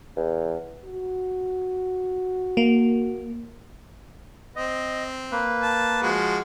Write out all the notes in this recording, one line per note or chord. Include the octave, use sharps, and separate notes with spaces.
E2
F#4
A#3
C4 D#5
A#3 B4
A5
F3 G#3 F#4